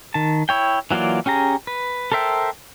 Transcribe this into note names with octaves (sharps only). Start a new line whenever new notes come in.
D#3 A5
E4 C#5 G5
E3 F#3 A#3 F4 D5
C#4 G4 G#4 A#5
B4
A4 A#4 C5 E5 G5